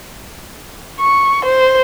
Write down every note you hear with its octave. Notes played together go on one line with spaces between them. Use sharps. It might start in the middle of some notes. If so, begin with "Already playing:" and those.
C#6
C5